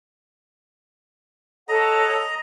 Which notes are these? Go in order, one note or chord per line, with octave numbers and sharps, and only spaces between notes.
A4 C#5 D#5 F#5 A#5